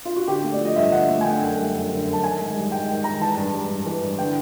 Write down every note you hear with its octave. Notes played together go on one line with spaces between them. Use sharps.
F4
F#4
D3 G4
A3
D5
F3 D#5
G2 E5
D3 F#5
A3
G#5
D3 G5
F#2
G3
F#2
D3
F#2
A5
D#3 G#5
G#2
G3
G#2 G5
D#3 G5
G#2 A#5
E3 A5
G2
G3
G2
E3
G2
D3 G5